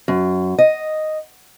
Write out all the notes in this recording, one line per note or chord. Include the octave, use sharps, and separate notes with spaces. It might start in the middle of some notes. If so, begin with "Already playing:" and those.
F#2
D#5